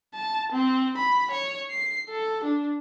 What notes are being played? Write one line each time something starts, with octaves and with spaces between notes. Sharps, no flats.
A5
C4
B5
C#5
C7
A4
D4